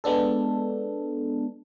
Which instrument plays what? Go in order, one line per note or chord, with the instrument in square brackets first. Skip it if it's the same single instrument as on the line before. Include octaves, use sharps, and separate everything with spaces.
[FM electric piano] G#3 B3 D4 A4